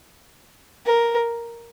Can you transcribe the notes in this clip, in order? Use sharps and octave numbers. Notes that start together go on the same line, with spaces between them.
A#4